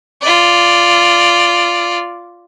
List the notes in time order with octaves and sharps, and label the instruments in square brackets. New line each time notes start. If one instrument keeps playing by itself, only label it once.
[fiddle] F4 D5